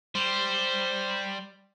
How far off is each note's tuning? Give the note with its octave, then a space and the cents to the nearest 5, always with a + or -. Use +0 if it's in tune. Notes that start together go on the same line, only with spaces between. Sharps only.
G3 +0 C5 +0